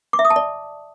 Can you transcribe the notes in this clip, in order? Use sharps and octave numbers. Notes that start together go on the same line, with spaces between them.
D6
E5
D#6
A5
D5